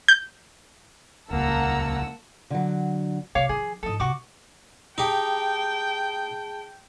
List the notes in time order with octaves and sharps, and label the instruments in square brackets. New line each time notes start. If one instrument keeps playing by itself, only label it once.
[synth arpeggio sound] G6
[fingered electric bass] D#1 C#2 [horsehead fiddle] A#3 A#5 [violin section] F#5 A5 E6
[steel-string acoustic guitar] D3 F#3
[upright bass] C3 [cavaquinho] C#5 F5 D6
[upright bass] D#3 F3 [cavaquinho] G#4
[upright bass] G#2 F3 [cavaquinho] A4 D#5
[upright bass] C3 B3 [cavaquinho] F#4 C#6 D6
[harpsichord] D#4 G4 [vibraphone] G#4 A5 [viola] G5